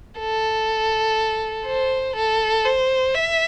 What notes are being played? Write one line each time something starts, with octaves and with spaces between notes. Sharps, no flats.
A4
C5
A4
C5
E5